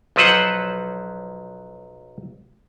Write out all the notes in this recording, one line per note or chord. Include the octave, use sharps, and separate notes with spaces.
B1 F3 F#3 B4 C5 F#5